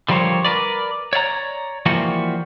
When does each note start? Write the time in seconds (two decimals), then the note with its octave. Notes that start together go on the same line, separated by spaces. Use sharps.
0.08 D3 F3 G3 A#4 C5 C#5
0.44 A#4 B4 D5
1.13 C#5 D5 F5 A#5
1.86 E3 F3 G3 A#3 F#4